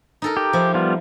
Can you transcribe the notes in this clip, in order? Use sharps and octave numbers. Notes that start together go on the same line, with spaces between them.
D#4 A4 A#4
G4
F3 E4
G3 B3 F4